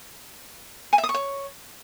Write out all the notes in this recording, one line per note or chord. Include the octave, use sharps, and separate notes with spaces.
G#5
E5
D#6
C#6
C#5